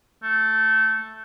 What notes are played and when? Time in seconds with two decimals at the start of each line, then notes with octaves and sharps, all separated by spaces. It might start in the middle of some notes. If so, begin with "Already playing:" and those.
0.23 A3